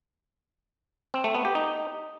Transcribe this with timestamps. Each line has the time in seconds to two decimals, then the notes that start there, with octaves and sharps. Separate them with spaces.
1.14 C4
1.24 A3
1.35 B3
1.45 G4
1.55 D#4